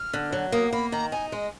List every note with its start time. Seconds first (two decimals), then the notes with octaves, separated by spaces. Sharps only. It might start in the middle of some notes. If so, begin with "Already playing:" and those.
Already playing: F6
0.13 D3
0.33 F#3
0.52 A#3 D#6
0.73 A#3 B5
0.92 D#3 A#5
1.12 D#4 G#5
1.32 G#3 D#5